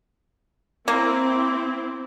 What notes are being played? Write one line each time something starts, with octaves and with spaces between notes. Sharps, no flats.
A#3 C4 E4